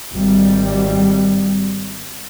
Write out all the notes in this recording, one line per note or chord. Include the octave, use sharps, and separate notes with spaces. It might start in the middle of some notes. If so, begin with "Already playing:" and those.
G#1 G3